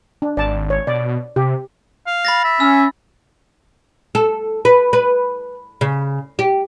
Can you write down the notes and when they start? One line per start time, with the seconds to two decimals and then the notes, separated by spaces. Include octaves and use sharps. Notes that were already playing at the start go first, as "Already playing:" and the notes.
0.22 D4
0.37 G#1 D5 A5
0.70 C#5
0.87 B2 D5
1.36 C3 G4
2.07 F5
2.25 B5 A6 A#6
2.45 E5
2.60 C#4 E6
4.15 A4
4.65 B4
4.93 B4
5.81 C#3
6.39 G4